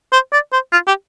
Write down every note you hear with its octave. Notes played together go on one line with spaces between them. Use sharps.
C5
D5
C5
F4
G4